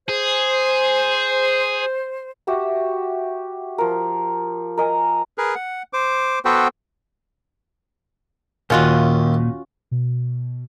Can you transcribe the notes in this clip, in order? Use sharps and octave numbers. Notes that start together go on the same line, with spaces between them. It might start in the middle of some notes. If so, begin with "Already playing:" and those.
G#4 C5
F#4 G4 E5 F#5
F3 A#4
A#4 D#5 G#5
G#4 A#4 B4
F#5
C5 D6
B3 F#4 A4 B4 C5 G5
D#2 A#2 C#4 F4 F#4
B2